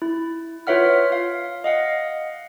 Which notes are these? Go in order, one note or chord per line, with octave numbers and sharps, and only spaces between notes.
E4
F4 B4 C#5 E5 F#5 F6
F5
D#5 F5 F#5